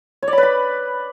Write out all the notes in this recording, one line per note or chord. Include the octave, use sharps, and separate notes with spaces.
C#5
D5
B5
B4
B5